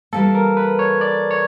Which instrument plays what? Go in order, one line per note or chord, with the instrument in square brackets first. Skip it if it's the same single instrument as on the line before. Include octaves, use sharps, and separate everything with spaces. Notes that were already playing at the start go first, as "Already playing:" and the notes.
[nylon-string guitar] E3 G3 A#3 [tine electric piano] A4
[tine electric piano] A#4
B4
C#5
D5
C#5